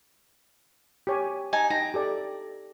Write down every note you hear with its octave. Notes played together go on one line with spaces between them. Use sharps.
G4 C#5 G#5
D#4 G#5 A5
D#4 G5 A5 A#5
G4 A4 D5